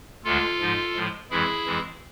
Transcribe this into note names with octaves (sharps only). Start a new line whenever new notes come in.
D2 D3 G#3 F4 A4
G#2 F3 G#3
A2 F3 G#3
F2 E3 G#3 E4 G#4
F2 E3 G#3